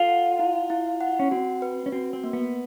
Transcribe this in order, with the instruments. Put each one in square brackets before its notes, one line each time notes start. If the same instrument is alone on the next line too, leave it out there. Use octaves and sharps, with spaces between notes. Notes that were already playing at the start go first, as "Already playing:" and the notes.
Already playing: [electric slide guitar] F4 [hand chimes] A4
[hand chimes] F#5
E4
E4
F#5
[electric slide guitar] C#4
[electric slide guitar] C4 [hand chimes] F#4
[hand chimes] B4
[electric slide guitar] C#4
[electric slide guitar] C4 [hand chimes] F#4
[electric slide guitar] C4
[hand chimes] A#3
[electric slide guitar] B3